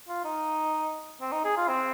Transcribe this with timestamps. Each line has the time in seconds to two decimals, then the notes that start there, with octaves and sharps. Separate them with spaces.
0.09 F4
0.24 D#4
1.21 C4
1.32 D#4
1.45 G#4
1.57 F4
1.68 C4